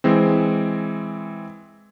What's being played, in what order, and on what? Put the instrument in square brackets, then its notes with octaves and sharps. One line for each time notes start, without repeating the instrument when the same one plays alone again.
[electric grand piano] E3 G#3 C4